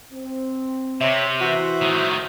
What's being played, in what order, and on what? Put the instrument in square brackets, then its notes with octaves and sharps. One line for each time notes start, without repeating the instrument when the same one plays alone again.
[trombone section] C4
[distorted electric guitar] C3 [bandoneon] G4 C#5 [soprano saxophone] E5
[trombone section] E3 [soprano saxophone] F#4 [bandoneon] C5 E5
[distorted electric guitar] A2 D#3